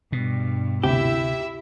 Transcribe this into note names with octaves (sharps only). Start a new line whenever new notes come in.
G2 B2
D2 C3 E4 G4 E5